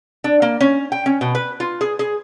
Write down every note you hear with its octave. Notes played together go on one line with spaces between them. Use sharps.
D4
A#3
C#4
G5
C#4
B2
B4
F4
G#4
G#4